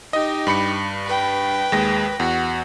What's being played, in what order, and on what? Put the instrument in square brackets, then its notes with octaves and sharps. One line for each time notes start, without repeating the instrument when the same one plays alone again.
[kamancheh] D#4 G4 [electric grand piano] D#5
[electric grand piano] G2 B5 C#7
[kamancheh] B4 G5
[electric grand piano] D#2 G#3 A#6
[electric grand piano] E2 [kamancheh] F#4